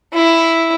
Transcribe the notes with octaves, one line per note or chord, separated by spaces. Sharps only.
E4